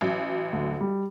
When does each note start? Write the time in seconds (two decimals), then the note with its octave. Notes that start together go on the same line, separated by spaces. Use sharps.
0.01 A1 F#3
0.53 D2
0.81 G3